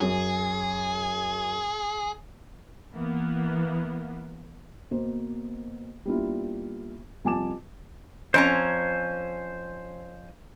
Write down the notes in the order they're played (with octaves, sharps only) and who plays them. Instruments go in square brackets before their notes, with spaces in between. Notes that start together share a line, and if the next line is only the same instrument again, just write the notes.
[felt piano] F#2 [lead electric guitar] G#4
[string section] E3 A#3 B3
[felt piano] B2 A#3 C5
G3 A#3 B3 D4 E4 F4
C2 F2 G#5 A5 D6 E7
[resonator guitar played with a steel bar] F2 C#4 A#5 [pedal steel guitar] C5 G#5